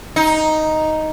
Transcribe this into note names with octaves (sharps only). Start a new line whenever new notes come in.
D#4